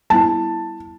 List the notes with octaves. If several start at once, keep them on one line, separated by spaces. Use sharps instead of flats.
G3 B3 E4 A5